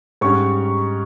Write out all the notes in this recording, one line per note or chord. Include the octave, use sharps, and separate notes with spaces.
G#2 G3 C#4 C#6